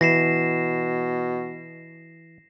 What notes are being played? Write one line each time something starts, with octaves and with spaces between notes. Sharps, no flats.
B2 E3 A#6 C7 E7